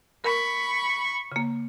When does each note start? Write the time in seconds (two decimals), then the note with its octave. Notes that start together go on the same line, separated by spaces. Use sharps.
0.24 A#4 B5 C#6
1.32 C#3 A#3